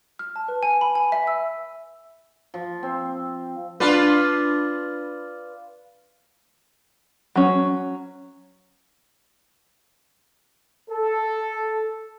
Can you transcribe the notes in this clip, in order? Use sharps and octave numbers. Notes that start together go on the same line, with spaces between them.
F6
A5
B4
G#5
B5
G#5
E5
E6
F3
C4
D4 F4 B4
F#3 C#4
A4